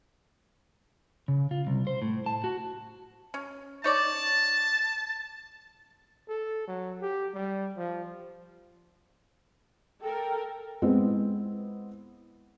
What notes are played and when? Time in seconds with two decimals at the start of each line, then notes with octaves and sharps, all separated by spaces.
1.28 C#3
1.51 F4
1.67 C2
1.87 C5
2.02 A2
2.26 A5
2.44 F#4
3.34 C#4
3.84 D#4 C#5 D5 A5
6.29 A4
6.67 F#3
7.02 G4
7.34 G3
7.77 F3
10.02 A4 A#4 G5
10.82 G#3 B3 C4 E4